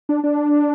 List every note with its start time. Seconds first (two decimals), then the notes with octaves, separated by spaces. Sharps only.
0.09 D4
0.24 D4